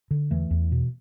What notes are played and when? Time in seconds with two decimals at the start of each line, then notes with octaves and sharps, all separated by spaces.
0.11 D3
0.31 E2 E3 A3
0.51 E2
0.72 B2